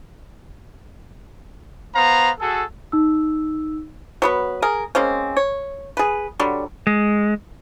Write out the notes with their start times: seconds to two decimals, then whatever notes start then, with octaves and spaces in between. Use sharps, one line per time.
1.94 B3 C5 F5 A#5
2.39 F#4 G#4 A4
2.92 D#4 E6
4.22 F#3 B3 B4
4.62 G#4 A#4
4.95 G#3 A#3 C4 C#4
5.37 C#5
5.97 G#4 B4
6.39 D3 F#3 G3
6.87 G#3